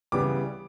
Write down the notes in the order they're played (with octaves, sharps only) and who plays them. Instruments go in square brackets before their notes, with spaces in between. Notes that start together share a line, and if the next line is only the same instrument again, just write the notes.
[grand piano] C#3 E3 G3 B3 D6